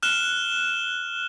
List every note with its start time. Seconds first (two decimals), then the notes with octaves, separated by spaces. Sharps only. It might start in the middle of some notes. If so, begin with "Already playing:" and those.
0.03 F6 F#6 E7 G7